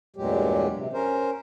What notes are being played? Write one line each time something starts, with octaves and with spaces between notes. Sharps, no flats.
E2 G2 A#2 F#3 G#3 G4
C3
C#4 A#4 C5